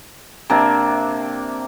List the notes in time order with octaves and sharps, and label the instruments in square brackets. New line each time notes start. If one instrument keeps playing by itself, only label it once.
[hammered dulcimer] C3 A#3 D4